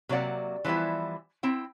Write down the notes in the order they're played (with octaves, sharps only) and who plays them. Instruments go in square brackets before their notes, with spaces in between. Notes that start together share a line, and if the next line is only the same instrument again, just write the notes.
[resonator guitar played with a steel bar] C3 F#3 A#3 D5 F#5
E3 F3 G3 B3 E4
C4 E4 G5